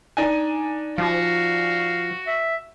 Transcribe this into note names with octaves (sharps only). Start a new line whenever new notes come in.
D4 D#4 G#5
F3 F#4 F5
E5